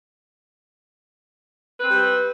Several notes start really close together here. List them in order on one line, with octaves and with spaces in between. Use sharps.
B4 C4 G3